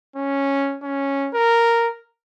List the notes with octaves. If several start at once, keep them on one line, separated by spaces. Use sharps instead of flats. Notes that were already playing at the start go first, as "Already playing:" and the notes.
C#4
C#4
A#4